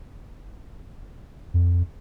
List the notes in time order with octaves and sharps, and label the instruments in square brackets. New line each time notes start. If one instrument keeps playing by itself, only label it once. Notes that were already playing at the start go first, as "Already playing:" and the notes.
[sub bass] F2